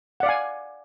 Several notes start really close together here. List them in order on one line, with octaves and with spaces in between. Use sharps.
F#5 D5 F5 G#5